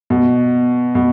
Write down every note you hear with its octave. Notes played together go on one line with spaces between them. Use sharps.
B2
B2